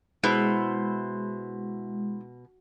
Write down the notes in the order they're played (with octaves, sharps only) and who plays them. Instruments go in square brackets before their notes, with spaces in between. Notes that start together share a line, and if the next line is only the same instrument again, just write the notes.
[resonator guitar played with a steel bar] B2 [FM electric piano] G#3 [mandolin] E4 C5